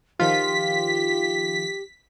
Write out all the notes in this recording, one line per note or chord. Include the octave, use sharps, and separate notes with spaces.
D#3 F3 F4 G4 B6